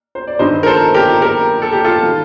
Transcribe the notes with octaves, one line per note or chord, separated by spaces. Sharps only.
C5
D5
G2 D#3 G3 C5 D#5
A#4
A4 C5
G4 A#4
G4 A#4
A4
G4
F4 A4
D#3 G3